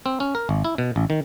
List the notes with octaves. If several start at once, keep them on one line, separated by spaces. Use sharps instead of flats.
C4
C#4
A#4
G#1
E4
B2
A1
D#3